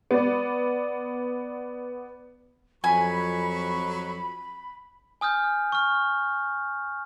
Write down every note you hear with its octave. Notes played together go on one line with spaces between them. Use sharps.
B3 D5
F2 F#3 G#5 B5 C#6
G#5 D#6 F6 G6
C#6 F6